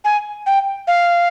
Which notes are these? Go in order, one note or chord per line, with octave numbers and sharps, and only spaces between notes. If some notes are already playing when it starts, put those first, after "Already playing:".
G#5
G5
F5